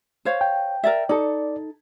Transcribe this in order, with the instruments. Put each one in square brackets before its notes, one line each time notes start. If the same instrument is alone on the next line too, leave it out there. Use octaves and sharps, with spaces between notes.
[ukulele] C5 C#5 F5
[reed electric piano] G5
[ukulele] A#4 D5 E5
[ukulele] D#4 A4 [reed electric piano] D5